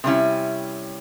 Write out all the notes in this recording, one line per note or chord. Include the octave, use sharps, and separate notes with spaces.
C3 G3 C#4 E4